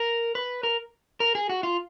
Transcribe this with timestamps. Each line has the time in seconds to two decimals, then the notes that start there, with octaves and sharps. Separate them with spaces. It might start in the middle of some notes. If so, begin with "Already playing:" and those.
Already playing: A#4
0.35 B4
0.63 A#4
1.20 A#4
1.35 G#4
1.49 F#4
1.63 F4